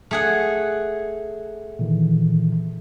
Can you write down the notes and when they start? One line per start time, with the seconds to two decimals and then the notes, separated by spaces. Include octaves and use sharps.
0.11 A3 G#4 F#5
1.79 A#2 D#3 E3